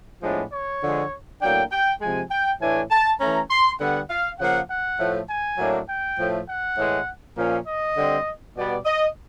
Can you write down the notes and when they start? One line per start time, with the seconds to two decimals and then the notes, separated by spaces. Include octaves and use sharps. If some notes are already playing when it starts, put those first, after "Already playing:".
0.22 A2 F3 G#3 B3 D4
0.52 C#5
0.82 D3 F3 G#3
1.41 A2 F#3 A#3 D4 G5
1.71 G5
2.01 C3 F3 G#3 G#5
2.30 G5
2.60 A2 E3 A3 D4 G#5
2.91 A5
3.19 E3 A3 C#4 A#5
3.50 C6
3.79 D3 G3 B3 F#5
4.09 F5
4.39 C#3 F3 A#3 F#5
4.69 F#5
4.98 A2 F3 A3
5.29 G#5
5.58 A2 F#3 A#3 D4
5.87 G5
6.18 A2 F3 A3
6.47 F#5
6.77 A2 E3 G#3
7.36 A#2 F3 A#3 C#4 F5
7.67 D#5
7.96 D3 G3 C4
8.56 B2 G3 B3 D5
8.85 D#5